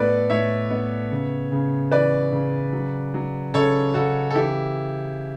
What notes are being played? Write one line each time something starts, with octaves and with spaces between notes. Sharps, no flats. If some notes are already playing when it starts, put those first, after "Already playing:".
Already playing: A2 B3 A4 B4 D5
A2 C#5 E5
B3
C#3
C#3
E3 B4 D5
C#3
F#3
F#3
C#3 A4 C#5
C#3 F#4 A4
A4
E3 E4 G4